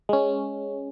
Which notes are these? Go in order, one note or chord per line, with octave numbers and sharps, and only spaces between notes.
G#3 C#4